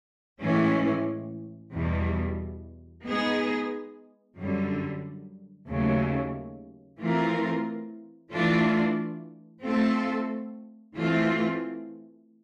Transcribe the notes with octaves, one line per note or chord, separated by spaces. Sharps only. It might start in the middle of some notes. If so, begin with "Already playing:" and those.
A2 E3 G#3 C#4
E2 B2 G3 B3
G#3 B3 D#4 G#4
F#2 D3 G3
D#2 C#3 F#3 A3
E3 A3 C4 F4 A#4
E3 A3 D4 F4
A3 C4 F4 A4
E3 A3 C4 F4